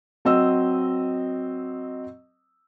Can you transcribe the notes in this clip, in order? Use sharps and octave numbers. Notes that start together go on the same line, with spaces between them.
F#3 C4 D#5 E6